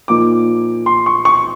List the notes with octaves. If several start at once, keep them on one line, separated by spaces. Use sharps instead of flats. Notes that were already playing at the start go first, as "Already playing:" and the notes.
A#2 F3 A#3 D#4 D6
C6
C#6
C#6